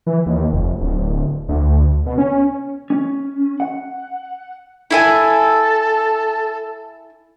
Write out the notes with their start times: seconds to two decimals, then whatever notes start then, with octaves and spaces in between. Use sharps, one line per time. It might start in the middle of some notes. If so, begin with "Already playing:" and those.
0.06 E3
0.26 D#2
0.52 F1
0.80 D1
1.49 D2
2.06 B2
2.18 C#4
2.90 C#4
3.60 F#5
4.90 E4 A4 E5 G#5